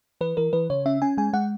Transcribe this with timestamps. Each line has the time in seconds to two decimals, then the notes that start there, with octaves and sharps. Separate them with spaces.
0.21 E3 B4
0.37 E3 A#4
0.53 E3 B4
0.70 C#3 C#5
0.86 C#4 E5
1.02 C#4 G#5
1.18 G#3 G#5
1.33 G#3 F#5